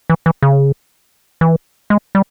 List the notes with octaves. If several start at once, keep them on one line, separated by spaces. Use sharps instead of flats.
E3
E3
C#3
E3
G#3
G3